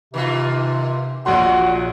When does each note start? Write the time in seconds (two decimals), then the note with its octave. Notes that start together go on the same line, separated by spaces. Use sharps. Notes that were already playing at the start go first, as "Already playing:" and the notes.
0.14 C3 D#3 E3 F4
1.26 A#1 A#2 F#3 G#3 F#4 F#5 C6